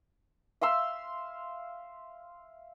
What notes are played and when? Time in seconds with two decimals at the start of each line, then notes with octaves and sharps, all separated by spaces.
0.61 E5 F5 C6 E6